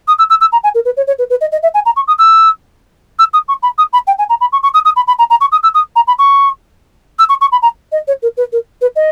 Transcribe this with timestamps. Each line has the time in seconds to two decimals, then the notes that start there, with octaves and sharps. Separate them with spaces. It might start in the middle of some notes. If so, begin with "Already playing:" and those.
0.08 D#6
0.18 E6
0.30 E6
0.41 E6
0.52 A#5
0.63 G#5
0.75 A#4
0.85 B4
0.97 C#5
1.07 C#5
1.19 B4
1.30 B4
1.41 D#5
1.52 D#5
1.63 E5
1.74 G#5
1.85 A#5
1.96 C#6
2.08 D#6
2.19 E6
3.19 E6
3.33 D#6
3.48 C#6
3.63 B5
3.78 D#6
3.93 B5
4.07 G5
4.18 G#5
4.29 A#5
4.41 B5
4.52 C#6
4.63 C#6
4.74 D#6
4.85 D#6
4.96 B5
5.07 B5
5.19 A#5
5.30 A#5
5.41 C#6
5.52 D#6
5.63 E6
5.74 D#6
5.96 A#5
6.07 B5
6.19 C#6
7.19 E6
7.29 C#6
7.41 C#6
7.52 B5
7.62 A#5
7.92 D#5
8.07 C#5
8.22 A#4
8.37 B4
8.52 A#4
8.81 B4
8.96 D#5